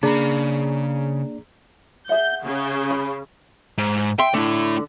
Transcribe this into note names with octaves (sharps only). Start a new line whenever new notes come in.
C#3 A#3 D4 G#4 D5 A#5 B5
G#4 E5 F#5 G6
C#3
B5
G#2
E5 G5 C6
D3 A3 E4